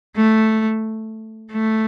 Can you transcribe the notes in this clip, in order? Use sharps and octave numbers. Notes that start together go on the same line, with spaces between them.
A3
A3